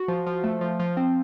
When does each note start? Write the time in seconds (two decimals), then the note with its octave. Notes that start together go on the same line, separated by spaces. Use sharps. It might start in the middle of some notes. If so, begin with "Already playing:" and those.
Already playing: F#4
0.08 F3
0.27 F3
0.44 A3
0.61 F3
0.80 F3
0.97 C4